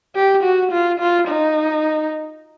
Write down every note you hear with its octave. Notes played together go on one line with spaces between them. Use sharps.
G4
F#4
F4
F4
D#4